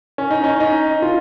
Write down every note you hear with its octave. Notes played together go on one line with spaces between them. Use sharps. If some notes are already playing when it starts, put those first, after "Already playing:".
C#4
D#4
C#4
D#4
F4